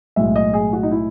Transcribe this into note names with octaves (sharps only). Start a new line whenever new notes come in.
B1 A2 G#3 E5
D#5
G#4
F#4
D#4
E4